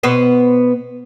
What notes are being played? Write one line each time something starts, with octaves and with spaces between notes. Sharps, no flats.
B2 B3 C5